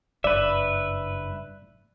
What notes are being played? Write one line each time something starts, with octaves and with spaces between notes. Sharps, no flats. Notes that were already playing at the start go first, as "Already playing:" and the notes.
F#1 G2 B4 D5 E5